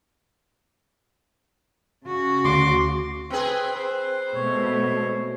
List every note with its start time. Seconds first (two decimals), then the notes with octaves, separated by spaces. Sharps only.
2.05 C#3 F#4
2.44 D2 C6 D6
3.30 C4 G#4 B4 G5
3.75 B4 C5
4.34 B2 G#3 A3 C#5